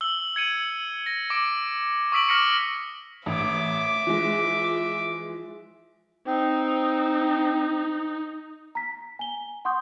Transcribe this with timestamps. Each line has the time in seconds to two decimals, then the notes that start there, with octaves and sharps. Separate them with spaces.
0.01 E6 F#7 G7
0.36 G#6 C#7 D#7
1.06 A#6
1.30 D6 D7
2.12 C#6 D#6 E6 B6 D7 F#7
2.29 D6 F6 A#6 B6 C#7
3.26 A1 E5 D6
4.07 E3 F3 G#3
6.27 C4 D#4
8.75 A#5 B6
9.19 G#5 G7
9.65 F#5 C6 C#6 D#6 G6